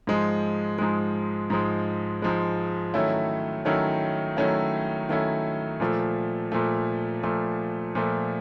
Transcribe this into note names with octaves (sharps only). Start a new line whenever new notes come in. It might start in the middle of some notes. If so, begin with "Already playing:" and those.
G#2 F3 G#3
G#2 F3 G#3
G#2 F3 G#3
G#2 F3 G#3
D#3 F#3 A3 C#4 E4
D#3 F#3 A3 C#4 E4
D#3 F#3 A3 C#4 E4
D#3 F#3 A3 C#4 E4
A#2 F3 A3
A#2 F3 A3
A#2 F3 A3
A#2 F3 A3